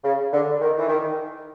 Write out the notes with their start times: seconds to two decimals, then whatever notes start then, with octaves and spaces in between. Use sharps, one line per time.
0.04 C#3
0.32 D3
0.61 D#3
0.78 E3
0.88 D#3